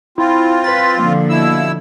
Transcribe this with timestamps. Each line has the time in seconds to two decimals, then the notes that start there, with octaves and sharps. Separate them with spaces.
0.18 C4 E4 F4
0.64 B4 A6
0.99 D3 F3 A#3
1.30 B2 E4 E6